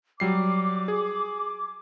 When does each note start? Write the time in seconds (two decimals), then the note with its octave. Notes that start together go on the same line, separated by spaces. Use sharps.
0.20 F#3 G3 D6 C7
0.88 G#4